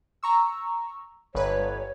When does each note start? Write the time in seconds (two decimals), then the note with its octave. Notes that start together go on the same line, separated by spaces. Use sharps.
0.23 A#5 C#6 E6
1.35 G1 B4 C#5